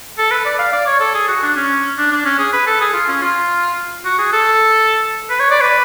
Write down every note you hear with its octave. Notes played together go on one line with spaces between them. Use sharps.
A4
B4
D5
F5
D5
C#5
A4
G#4
F#4
D4
C#4
D4
D4
C#4
G#4
B4
A4
G#4
F4
C#4
F4
F#4
G#4
A4
B4
C#5
D5
B4